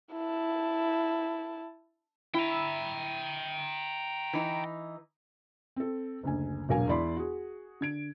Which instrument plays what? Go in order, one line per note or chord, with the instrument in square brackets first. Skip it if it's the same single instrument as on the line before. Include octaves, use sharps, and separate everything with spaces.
[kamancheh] E4 A5
[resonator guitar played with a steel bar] E4 [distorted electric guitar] G5 A#5
[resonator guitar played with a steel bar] E3 D#4
[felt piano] C4 A4
F#1 D2 G#5
E1 A#1 F#3 A#4 F5 G#5
E2 E4 D5 B5 C6
F#4 G#4
D3 G#6 D7